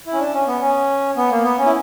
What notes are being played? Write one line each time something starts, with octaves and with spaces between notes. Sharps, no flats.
E4
C#4
D4
C#4
B3
C#4
B3
A#3
B3
C#4
E4